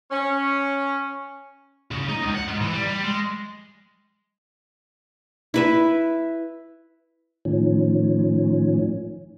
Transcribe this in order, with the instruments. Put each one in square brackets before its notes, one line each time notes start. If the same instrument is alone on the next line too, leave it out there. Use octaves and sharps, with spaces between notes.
[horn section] C#4
[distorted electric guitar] C#3
D#4
C#2
F#5
G#2
E3
G3
G3
G#3
[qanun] E4 B4 E5
[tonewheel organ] A2 D#3 F3 C#4